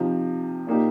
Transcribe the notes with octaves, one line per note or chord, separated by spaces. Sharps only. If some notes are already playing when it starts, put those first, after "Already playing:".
Already playing: C3 F3 D#4
A#2 A#3 D#4 G4